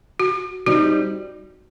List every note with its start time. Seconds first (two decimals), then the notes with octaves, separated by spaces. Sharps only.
0.20 F#4
0.66 G3 C4 D#4 F#4